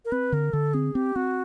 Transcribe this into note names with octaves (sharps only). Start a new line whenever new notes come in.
A#4
C4 B4
D3 A#4
D3 A4
C4 G#4
C4 G4
C4 F#4